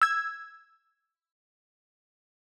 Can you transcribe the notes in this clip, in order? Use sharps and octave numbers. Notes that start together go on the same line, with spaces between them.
E6 G#6